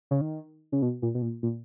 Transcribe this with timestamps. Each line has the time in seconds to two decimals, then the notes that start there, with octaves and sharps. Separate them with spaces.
0.11 C#3
0.21 D#3
0.72 C#3
0.82 B2
1.02 A#2
1.15 B2
1.22 A#2
1.43 A#2